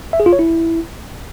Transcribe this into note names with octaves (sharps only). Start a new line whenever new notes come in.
E5
G#4
F4
C#5
E4